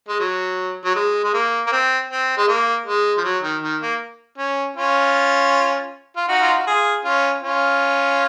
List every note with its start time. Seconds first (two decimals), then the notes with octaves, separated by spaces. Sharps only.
0.08 G#3
0.20 F#3
0.85 F#3
0.95 G#3
1.24 G#3
1.33 A#3
1.67 A#3
1.72 C4
2.10 C4
2.37 G#3
2.48 A#3
2.86 G#3
3.18 F3
3.24 F#3
3.43 D#3
3.63 D#3
3.82 A#3
4.38 C#4
4.76 C#4 F4
6.17 F4
6.28 D#4 F#4
6.41 F4
6.54 F#4
6.67 F4 G#4
7.05 C#4 F4
7.43 C#4 F4